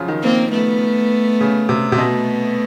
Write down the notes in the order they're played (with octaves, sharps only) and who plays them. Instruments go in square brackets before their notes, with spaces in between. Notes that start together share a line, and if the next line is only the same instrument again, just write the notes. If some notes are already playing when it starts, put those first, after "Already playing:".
Already playing: [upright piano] C#3 F3 F#3
D#3
[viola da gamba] A#3 C4
A3 B3
[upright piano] C#3
C3
C3
[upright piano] B2 [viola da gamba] A3 B3